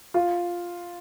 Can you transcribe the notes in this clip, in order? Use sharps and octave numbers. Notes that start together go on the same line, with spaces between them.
F4